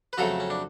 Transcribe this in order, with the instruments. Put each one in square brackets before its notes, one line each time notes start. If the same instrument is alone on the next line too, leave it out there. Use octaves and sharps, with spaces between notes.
[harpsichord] B4
F2 C#3 F#3 A3 F#4 A4
C#4
D4